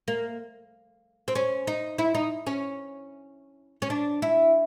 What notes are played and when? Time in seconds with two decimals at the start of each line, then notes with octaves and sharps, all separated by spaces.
0.08 A#3
1.28 C4
1.35 C#4
1.67 D#4
1.98 E4
2.15 D#4
2.47 C#4
3.82 C#4
3.90 D4
4.22 E4